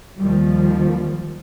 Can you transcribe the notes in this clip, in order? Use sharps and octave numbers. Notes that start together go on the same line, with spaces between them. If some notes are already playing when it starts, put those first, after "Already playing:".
D#2 D#3 F3 G3